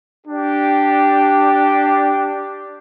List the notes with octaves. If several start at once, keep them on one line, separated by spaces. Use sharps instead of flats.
D4 G4